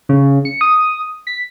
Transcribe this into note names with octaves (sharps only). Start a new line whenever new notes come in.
C#3
C#7
D#6
B6